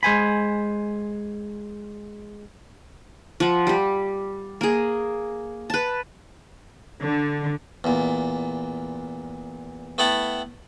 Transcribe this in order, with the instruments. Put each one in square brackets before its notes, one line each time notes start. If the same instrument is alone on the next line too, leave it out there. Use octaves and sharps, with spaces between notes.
[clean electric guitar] G#3 C5 G#5 B5
[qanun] F3 F#5
G3 G4
A#3 G#4
B4 A5
[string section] D3
[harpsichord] E2 A#2
A3 B3 E4 F#5 G5 A5